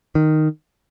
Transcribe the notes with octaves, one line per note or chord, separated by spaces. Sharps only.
D#3